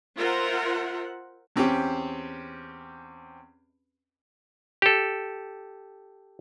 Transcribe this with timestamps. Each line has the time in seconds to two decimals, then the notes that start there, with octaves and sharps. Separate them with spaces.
0.17 F4 A#4 C5 E5 F#5
1.56 E2 C4 C#4 G4
4.82 G4 A4